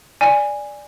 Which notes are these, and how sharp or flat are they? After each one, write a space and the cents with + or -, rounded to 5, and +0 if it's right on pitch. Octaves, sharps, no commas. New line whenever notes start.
D5 +0 G#5 -10